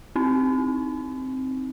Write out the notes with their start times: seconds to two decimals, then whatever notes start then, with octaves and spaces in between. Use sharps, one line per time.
0.16 C4 D#4